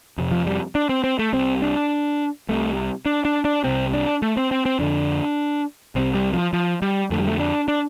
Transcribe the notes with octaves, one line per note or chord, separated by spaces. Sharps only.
F2 C3
F3
G3
D4
C4
C4
A3
C2 C3 C4
D4
C2 C3 A3
D4
D4
D4
C2 C3 C4
D4
A3
C4
C4
C4
F2 D3 D4
C2 C3 C4
G3
F3
F3
G3
F2 D3 A3
G3
A3
D4
D4